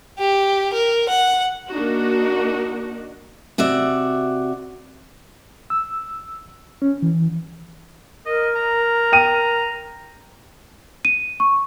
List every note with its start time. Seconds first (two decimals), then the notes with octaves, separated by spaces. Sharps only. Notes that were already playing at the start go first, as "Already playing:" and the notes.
0.19 G4
0.74 A#4
1.09 F#5
1.71 A#3 D4 D#4 F#4
3.58 C3 F#4 D5 E5
5.70 E6
6.82 C#4
7.02 E3
8.26 A#4 D#5
8.55 A#5
9.12 G5 D#7
11.05 D#7
11.40 C#6